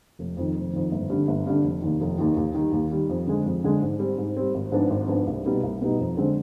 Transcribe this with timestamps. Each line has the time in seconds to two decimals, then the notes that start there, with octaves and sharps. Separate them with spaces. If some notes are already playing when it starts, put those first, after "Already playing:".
0.19 F1
0.37 F2 D#3
0.55 F1
0.73 F2 D#3
0.92 G1
1.10 G2 D3
1.28 G1
1.47 G2 D3
1.64 F1
1.82 D#2 D#3
2.01 F1
2.19 D#2 D#3
2.37 D#2
2.55 D#3
2.60 G3
2.72 D#2
2.91 D#3 G3
3.10 F2
3.27 D3 G#3
3.46 F2
3.64 D3 G#3
3.81 G#2
3.99 G3 C4
4.18 G#2
4.37 G3 C4
4.55 G#1
4.72 G#2 F3 B3 D4
4.90 G#1
5.08 G#2 F3 B3 D4
5.27 C2
5.44 B2 G3 B3 D#4
5.63 C2
5.81 B2 G3 B3 D#4
6.00 F2
6.17 D3 G#3 C4